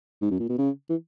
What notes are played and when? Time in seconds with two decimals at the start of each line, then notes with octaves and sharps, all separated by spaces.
0.22 G#2
0.30 F#2
0.40 A#2
0.49 B2
0.58 C#3
0.90 E3